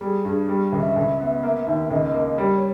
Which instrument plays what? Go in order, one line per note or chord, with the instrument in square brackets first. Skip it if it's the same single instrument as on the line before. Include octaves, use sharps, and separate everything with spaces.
[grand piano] G3 [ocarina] G#4
[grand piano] G2 [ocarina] G#4
[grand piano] G3
C#2
[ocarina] E5
[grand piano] C#2
B3
A#3
D#2
[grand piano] C#2 [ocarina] D#5
[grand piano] A#3
[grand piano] G3 [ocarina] C#5